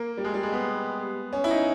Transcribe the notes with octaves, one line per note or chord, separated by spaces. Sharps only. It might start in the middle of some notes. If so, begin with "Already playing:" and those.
Already playing: A#3
G3
G#3
G3
G#3
B3
C#4
E4
D#4